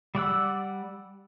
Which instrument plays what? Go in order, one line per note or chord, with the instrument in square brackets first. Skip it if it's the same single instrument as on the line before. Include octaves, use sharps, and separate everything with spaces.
[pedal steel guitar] G3 D5 F#5 E6